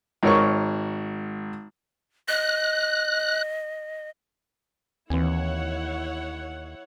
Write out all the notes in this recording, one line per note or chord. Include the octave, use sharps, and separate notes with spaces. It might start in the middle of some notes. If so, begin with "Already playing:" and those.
G#1 A#4 C#5 C#6
D#5 F#6
D#2 E3 C4 E4 C#5 F#5